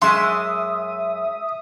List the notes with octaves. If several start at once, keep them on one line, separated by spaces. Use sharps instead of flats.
F#2 G#3 E5 C6 D#6